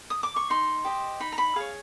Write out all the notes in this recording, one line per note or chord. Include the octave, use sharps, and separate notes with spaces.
D#6
D6
C#6
D#4 C6
G4 C5 D#5
D#4 B5
A#5
B5
G#4 C#5 F5